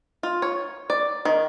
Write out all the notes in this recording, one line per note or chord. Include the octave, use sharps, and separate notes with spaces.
F4
C#5
D5
D#3